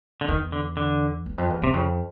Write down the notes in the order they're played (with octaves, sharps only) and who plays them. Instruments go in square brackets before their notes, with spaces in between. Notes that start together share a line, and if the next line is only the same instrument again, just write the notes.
[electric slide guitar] D3
[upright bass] E2 [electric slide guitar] D#3
[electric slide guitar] D3
D3
[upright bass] E2
F2
E2
[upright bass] E2 [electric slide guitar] C3
[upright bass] F2 [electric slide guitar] C#3